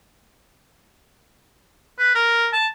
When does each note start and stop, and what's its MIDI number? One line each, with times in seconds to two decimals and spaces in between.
1.99 2.13 71
2.15 2.47 70
2.53 2.66 81